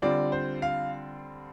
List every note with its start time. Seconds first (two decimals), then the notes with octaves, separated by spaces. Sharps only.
0.02 D3 G3 C4 F4 D5
0.32 C5
0.62 F5